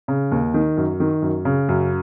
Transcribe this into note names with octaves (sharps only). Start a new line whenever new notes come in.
C#3
D#2
D#3
F#2
D#3
F#2
C#3
F#2